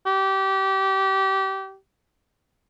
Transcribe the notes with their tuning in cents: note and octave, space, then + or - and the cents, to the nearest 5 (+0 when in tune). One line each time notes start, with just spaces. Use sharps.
G4 -25